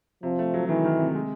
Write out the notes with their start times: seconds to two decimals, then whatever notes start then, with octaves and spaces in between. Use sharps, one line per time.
0.23 C3 F3
0.39 A3
0.54 F#3
0.68 D#3 E3
0.84 D#3
0.99 C3
1.15 G#3